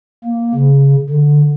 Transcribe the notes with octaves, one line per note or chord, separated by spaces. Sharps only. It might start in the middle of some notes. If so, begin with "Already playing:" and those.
A#3
C#3
D3